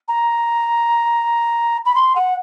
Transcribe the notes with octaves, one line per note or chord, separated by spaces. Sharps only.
A#5
B5
C6
F#5